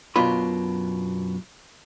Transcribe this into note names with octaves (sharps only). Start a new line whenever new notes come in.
F#2 B2 D4 F4 B5